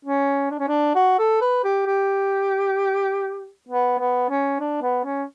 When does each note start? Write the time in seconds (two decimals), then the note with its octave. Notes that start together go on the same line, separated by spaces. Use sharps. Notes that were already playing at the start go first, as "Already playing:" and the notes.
0.05 C#4
0.51 D4
0.59 C#4
0.68 D4
0.95 F#4
1.18 A4
1.41 B4
1.64 G4
1.86 G4
3.68 B3
3.99 B3
4.29 C#4
4.59 D4
4.82 B3
5.05 C#4